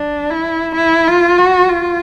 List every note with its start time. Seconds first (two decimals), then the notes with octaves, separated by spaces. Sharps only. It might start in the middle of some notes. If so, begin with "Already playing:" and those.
Already playing: D4
0.30 E4
0.76 E4
1.07 F4
1.38 F#4
1.69 F4